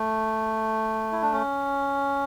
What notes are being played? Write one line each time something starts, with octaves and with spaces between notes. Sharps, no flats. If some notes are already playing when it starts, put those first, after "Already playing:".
Already playing: A3
E4
D4
C#4